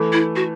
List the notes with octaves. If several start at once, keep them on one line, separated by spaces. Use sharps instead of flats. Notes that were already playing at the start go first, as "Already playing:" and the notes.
Already playing: E3 A3
E4
F#4